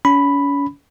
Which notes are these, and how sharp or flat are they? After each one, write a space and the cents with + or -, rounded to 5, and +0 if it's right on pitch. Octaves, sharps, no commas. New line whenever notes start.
C#4 +35 B5 +0